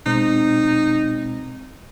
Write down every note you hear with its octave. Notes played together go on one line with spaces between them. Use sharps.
B2 G#3 C4 D#4